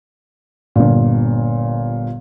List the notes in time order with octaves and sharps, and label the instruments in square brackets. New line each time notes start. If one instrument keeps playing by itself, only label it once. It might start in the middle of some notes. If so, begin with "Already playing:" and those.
[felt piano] G1 A#2